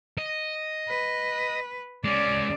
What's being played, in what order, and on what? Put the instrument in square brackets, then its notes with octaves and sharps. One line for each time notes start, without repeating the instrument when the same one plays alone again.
[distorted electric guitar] D#5
[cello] B4
[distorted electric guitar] G#3 C#4 [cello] D5